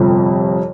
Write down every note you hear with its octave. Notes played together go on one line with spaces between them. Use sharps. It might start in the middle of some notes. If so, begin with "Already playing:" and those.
Already playing: G1 F2 C3